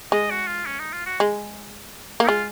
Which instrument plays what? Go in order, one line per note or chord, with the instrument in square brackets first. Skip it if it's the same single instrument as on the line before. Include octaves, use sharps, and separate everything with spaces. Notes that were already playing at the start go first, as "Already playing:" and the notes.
[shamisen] G#3 [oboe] D#5
[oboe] F#4
F4
C#4
D#4
F4
F#4
[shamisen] G#3
A#3
[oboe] D#4
[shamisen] G#3 [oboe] F4